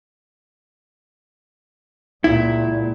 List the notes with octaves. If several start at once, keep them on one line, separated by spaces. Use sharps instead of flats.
C#2 A#2 E4